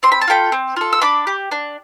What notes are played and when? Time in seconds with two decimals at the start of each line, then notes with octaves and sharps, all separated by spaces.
0.03 C4 C6
0.12 B5
0.21 A5
0.28 F4 A4 G5 B5
0.52 C4
0.76 F4 A4
0.93 E6
1.01 D4 B5 D6
1.27 G4
1.51 D4